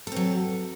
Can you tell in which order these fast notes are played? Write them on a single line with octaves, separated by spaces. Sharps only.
A4 C4 F#3